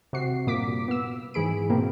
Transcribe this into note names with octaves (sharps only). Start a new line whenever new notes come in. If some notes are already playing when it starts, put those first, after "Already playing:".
C3 F#4 C7
G2 A#2 A#3 D6 B6
B3 E6
G#2 E3 G#4 B5 D7
B2 A#3 C4